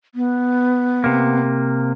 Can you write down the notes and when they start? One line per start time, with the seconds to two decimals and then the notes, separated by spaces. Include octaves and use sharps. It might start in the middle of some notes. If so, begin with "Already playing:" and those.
0.15 B3
1.04 C3 A#3